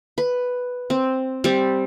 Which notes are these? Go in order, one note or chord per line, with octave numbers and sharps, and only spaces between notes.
B4
C4
G3 C4